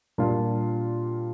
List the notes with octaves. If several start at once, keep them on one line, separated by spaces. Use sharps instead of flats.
A#2 G3 D4 F4